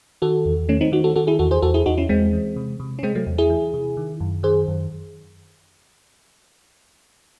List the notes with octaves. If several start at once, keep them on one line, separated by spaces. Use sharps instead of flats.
D#3 F#4 A4
E2
D#3 A3 C#4
C4 D#4
D#3 D#4 F#4
F#4 A4
D#3 F#4 A4
E4 G#4
E2 F#4 A4
G#4 C5
E2 F#4 A4
E4 G#4
E2 D#4 F#4
C#4 E4
E2 G#3 C4
E3
C3
C3
C#4
C3 G#3 C4
F#3 A3
E2
E4 G#4
E3
C3
D#3
F#2
D#3 G#4 C5
F#2